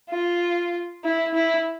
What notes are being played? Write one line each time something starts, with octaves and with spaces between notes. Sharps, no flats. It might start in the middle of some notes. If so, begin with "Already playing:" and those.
F4
E4
E4